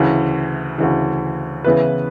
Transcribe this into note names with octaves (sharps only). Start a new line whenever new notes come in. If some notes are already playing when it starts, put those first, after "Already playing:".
Already playing: D2 C#3 E3
D2 C#3 E3
C#3 E3 B3 E4 B4